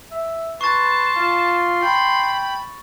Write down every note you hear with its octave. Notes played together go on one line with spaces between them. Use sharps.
E5
B4 A5 C6 C#6 A6
F4
G5 B5